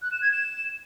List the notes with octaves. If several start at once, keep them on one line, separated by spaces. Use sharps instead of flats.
F#6
E7
G#6
E7